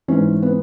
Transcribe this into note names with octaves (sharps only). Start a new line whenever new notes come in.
G#2 E3 C#4
B3